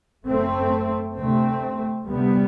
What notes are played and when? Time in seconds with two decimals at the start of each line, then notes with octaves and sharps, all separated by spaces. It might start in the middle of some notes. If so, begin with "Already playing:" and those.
0.27 F#1 F#2 A3 C4
1.17 D2 C3 A3 C4
2.07 D2 C3 G3 B3